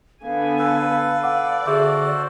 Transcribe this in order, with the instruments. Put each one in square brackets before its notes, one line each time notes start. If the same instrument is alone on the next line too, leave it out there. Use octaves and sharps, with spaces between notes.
[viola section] D3 B3 G#5 [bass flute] F5
[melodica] A4 B4
[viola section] D5 [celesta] F#5 D6
[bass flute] D3 [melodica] F#4 A4 C5 [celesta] G#4 E5 D6